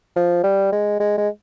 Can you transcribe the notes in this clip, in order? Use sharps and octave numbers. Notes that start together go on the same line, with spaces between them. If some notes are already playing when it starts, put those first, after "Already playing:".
F3
G3
G#3
G#3
G#3